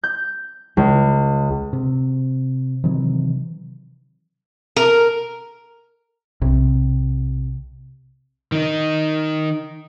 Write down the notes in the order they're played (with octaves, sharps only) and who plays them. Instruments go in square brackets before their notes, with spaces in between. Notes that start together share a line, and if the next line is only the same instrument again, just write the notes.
[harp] G6
C#2
[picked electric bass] C3
C3 D#3 E3 F#3
[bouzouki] A#4
[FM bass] B1 [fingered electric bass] C3
[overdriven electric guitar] D#3 D#4